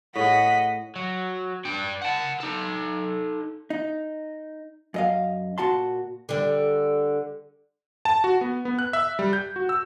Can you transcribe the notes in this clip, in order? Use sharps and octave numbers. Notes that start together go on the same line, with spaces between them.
A2 G#4 D#5 F#5 B6
F#3
D4 G5
F#5 A5
D#4 A4
D#4
F#2 D#5 F5
A#2 F#4 A5 C6
D3 G3
A5
F#4
B3
B3
F#6
E5
G3
G6
F#4
E6